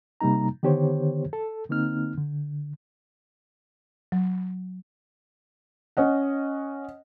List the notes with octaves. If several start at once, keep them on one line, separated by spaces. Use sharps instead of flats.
C3 G3 A#3 D#4 A#5
D3 D#3 B3 G4 C5 C#5
A4
D3 A#3 C4 D#4 F6
D3
F#3
C#4 D#5 F#5